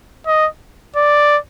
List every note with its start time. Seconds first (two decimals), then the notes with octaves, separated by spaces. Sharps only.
0.27 D#5
0.96 D5